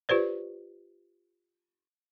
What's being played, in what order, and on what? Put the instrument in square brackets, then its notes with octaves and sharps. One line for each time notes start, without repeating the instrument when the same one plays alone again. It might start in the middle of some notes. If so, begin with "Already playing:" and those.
[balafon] F4 G4 B4 C5 D5